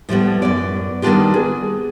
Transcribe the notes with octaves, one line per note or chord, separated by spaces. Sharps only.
A2 F3 G3 B3
F#2 B3 D5
D#3 G3 B3 D4 F4 G4
G#4